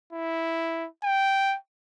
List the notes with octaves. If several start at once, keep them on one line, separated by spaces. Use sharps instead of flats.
E4
G5